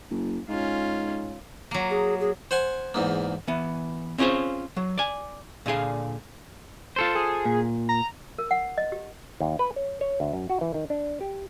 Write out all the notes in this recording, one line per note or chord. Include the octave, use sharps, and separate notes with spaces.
F#1
G#2 C#4 F4
F#3 A#3
G#4
G#4
C5 F#5 G#5 C6
E2 G#2 A#3
E3 B3
C4 C#4 F4 G#4 C5 C#5
F#3
D5 G#5
A#2 D3 G#4 F5
F4 A4 C5
G#4
A#2
A#5
A#4
F#5
D#5
G4
D#2
B4
C#5
C#5
D2
F#2
F#4
E3
D#3
D4
G4